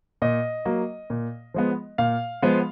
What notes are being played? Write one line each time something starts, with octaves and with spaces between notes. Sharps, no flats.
A#2 D#5
F#3 A#3
A#2
F3 G#3 B3
A#2 F5
F3 G#3 B3